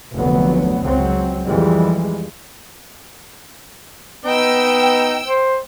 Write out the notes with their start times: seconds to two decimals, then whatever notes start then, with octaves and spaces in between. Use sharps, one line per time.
0.14 F1 D2 F#3 B3
0.83 C#2 F#3 C4
1.46 F2 E3 G3 G#3
4.25 B3 D#4 B4 D#5 G5 E6
5.25 C5